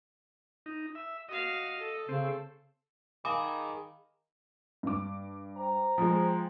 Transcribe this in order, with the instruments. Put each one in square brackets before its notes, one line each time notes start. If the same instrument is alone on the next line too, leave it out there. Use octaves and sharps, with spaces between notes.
[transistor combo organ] D#4
E5
[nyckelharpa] F#4 F5 [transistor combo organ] D#5
[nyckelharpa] A4
[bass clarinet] C#3 [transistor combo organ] C4
[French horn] D#3 [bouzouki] G#4 [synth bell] F5 B5 [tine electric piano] D6
[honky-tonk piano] G2 D6
[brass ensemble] C5 G5 A#5
[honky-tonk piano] F3 G#3